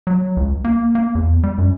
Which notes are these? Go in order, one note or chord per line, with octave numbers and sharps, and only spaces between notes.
F#3
C#2
A#3
A#3
E2
G3
F#2